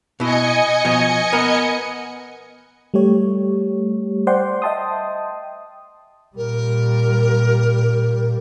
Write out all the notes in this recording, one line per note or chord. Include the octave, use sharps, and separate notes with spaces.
B2 E4 D#5 G#5 C#7
B2 F3
B3 A#4
G3 A3 G4 C#5
C5 D5 F#5 G5 C6
D#5 E5 G5 A5 C6 D#6
A#2 G3 A#4